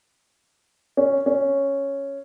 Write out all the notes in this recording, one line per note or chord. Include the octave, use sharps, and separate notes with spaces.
C#4
C#4